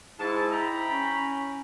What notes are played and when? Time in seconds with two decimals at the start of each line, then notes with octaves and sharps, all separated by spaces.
0.19 G#2 E4 A5
0.52 G5 A#5 B5
0.88 C#4